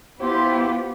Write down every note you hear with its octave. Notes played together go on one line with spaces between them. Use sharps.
B3 E4 F4 G4 C5